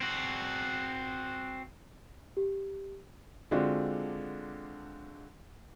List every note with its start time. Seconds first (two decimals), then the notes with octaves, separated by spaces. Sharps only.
0.01 C4 F#4
2.37 G4
3.51 D3 G#3 C4 D4 F4 F#4